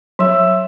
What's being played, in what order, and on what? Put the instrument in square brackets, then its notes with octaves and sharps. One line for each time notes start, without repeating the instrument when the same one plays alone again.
[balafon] F#3 [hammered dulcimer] E5